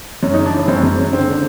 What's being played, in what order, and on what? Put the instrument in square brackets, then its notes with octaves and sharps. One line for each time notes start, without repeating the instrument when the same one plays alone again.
[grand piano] F#2 C#4
D#4
C#3
D4
E3 C#4
F#2 C4
F#2
C#3
D3 C4
D3